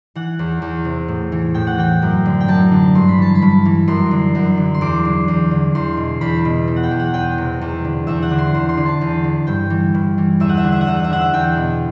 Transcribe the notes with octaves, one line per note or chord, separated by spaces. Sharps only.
E3 F#5
E2
E2
C3
A2
E3
A2 G5
F#5
E3 G5
F#2
D3
G5
F#2 A5
D3
G2 C6
B5
E3 A5
B5
G2
E3
F#2 C6
D3
F#2
D3
C6
E2 D6
D3
E2
D3
E2 C6
B2
E2 B5
B2
E3
F#5
G5
E2
F#5
E2 G5
C3
E2
D3
E2 E5
F#5
D3
C6
E2 C6
C6
D3
A5
E2
D3
G2 G5
E3
G2
E3
E2 E5
F#5
E5
D3 F#5
E5
F#5
E2 E5
F#5
E5
D3 F#5
E5
E2 G5
B2